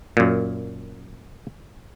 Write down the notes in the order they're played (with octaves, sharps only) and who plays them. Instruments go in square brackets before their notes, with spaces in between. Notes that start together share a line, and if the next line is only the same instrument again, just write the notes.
[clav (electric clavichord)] F#2 A#2